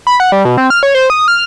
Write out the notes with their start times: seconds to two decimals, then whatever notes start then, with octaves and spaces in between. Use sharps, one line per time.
0.07 B5
0.20 F#5
0.32 G3
0.45 B2
0.58 C4
0.70 F6
0.83 C#5
0.95 C5
1.10 D#6
1.28 F6